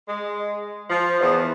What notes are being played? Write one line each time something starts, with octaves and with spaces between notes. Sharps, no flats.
G#3
F3
E2